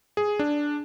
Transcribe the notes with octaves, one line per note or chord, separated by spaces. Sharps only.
G#4
D4